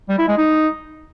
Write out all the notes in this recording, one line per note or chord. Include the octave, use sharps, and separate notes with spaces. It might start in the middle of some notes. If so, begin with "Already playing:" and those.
G3
E4
G#3
D#4